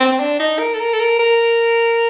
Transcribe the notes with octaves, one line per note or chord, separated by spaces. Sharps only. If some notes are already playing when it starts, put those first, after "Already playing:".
C4
C4
D4
D#4
A#4
A4
A#4
A4
A#4
A#4